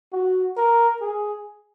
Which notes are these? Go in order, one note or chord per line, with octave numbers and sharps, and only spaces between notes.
F#4
A#4
G#4